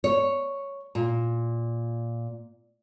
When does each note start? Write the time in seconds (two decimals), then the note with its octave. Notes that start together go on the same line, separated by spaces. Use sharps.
0.04 C#5
0.95 A#2